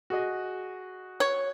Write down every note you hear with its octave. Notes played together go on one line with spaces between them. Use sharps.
F#4 G#4 D#5
C#5